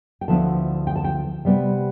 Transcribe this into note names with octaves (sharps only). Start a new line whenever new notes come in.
G5
D2 D3 F3 B3 E4 A5
G5
A5
G5
C3 G3 B3